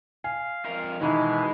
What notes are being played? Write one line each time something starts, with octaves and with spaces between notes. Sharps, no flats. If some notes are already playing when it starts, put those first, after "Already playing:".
F5 G#5
F2 A#4
B2 D#3 E3 G#3 E4 A#5